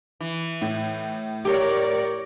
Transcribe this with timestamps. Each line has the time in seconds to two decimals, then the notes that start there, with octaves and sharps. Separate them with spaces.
0.21 E3
0.62 A2
1.45 G4 A#4 C#5 D5